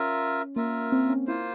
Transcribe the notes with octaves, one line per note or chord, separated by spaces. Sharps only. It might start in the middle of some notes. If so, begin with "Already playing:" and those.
Already playing: C#4 F4 A#4 E5
A#3 F4 A#4 E5
C4
C#4
A#3 E4 F4 C5